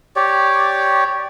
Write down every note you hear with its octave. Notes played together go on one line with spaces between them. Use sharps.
G4 C#5 D5